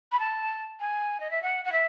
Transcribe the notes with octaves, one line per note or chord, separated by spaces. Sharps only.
B5
A5
G#5
D#5
E5
F#5
F#5
E5